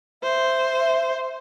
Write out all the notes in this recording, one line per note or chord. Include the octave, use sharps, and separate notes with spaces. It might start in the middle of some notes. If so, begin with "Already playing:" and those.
C5 E5